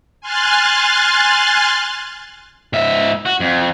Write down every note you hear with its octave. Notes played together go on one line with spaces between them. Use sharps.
G#5 C6 F6 F#6 A6
G#2 E5
F#4
F2